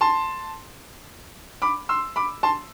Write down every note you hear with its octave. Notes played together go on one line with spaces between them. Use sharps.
A5 C6
B5 D6
C6 E6
B5 D6
A5 C6